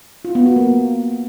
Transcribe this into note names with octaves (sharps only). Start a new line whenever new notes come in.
F4
B3
F#4
A#3